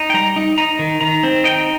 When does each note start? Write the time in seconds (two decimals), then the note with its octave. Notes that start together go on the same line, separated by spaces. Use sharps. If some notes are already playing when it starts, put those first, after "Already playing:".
Already playing: D#4
0.10 G5
0.14 G3 A#5
0.36 D#4
0.58 D#4 A#5
0.79 D#3
1.01 D#3 A#5
1.23 C4
1.44 D#4 G5